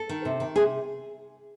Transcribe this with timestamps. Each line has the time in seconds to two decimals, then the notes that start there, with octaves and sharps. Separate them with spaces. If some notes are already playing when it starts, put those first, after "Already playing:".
Already playing: A4
0.09 D#3
0.25 C3
0.40 D#3
0.56 C3 G#4